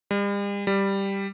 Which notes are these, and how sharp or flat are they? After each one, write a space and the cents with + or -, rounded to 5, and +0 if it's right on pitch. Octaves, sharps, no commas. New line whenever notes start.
G3 +45
G3 +5